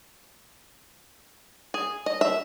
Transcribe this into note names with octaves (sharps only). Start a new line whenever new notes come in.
G#4
D#5
E5